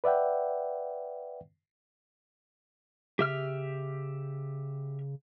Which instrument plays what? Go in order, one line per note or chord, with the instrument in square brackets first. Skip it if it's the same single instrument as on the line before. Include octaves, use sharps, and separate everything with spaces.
[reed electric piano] B4 D5 E5 F#5 G5
[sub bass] C#3 [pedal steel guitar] G4 E5 F6